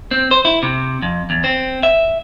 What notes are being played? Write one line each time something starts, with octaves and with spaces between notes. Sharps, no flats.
C4
C5
E4
C3
F2
E2
C4
E5